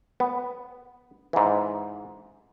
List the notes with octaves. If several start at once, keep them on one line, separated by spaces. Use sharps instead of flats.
B3
G#2 E3